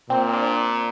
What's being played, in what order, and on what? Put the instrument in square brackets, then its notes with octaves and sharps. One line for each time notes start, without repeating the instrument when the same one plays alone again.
[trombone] A#2 [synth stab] C4
[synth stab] C4
D4